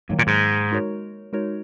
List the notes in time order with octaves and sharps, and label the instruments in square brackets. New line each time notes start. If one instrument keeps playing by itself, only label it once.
[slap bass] G#2 [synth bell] D#3 F#3 A#3
[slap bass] A#2
G#2
[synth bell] G#3 D#4 F#4 A#4 C#5
G#3 D#4 F#4 A#4 C#5